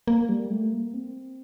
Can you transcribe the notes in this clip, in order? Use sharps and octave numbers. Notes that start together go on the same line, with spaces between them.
A#3
G3
A3
A#3
C4